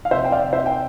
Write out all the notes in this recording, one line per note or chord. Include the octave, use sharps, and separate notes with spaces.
F5
C3 C5 E5
G5
D5 F5
C3
C5 E5
G5